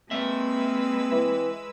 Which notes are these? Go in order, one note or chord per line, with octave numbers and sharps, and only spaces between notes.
G#3 A#3 C4 B4 E5 E6
E3